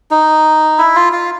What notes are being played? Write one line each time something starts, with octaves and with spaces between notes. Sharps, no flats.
D#4
E4
F4
F4